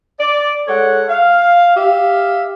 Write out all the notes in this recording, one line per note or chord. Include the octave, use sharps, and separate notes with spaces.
D5
G#3 A4 C#5 F#5
F5
G4 E5 F5